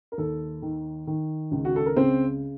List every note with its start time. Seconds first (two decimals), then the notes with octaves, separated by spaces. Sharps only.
0.12 A#4
0.18 D#2 A4
0.62 D#3
1.07 D#3
1.51 C#2
1.65 F#4
1.76 A4
1.86 A#4
1.96 C#3 C4 C5